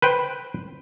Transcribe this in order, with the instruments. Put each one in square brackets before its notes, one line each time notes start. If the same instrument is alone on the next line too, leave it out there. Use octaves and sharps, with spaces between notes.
[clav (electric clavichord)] B4 C5 G5